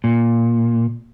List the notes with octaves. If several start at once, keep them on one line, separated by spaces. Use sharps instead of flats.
A#2